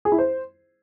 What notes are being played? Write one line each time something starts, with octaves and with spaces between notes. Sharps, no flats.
G#4
E4
C5